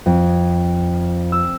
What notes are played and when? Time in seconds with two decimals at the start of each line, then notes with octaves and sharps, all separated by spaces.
0.06 F2
1.32 E6